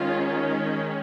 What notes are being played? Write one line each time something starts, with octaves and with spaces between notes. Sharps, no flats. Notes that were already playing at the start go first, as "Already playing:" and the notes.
Already playing: D#3 G#3 C#4 F4